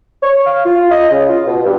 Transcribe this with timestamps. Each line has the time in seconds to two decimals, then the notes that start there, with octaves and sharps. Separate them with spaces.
0.21 C#5
0.45 F5
0.65 F4
0.91 D#5
1.11 C#3
1.29 F4
1.46 B2
1.65 G2